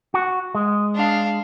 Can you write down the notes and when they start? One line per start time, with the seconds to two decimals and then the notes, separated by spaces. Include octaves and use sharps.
0.14 F#4
0.55 G#3
0.95 D4 F5